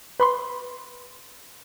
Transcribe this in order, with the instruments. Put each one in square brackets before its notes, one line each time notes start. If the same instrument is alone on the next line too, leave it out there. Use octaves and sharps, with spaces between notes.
[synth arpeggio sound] B4 B5 C6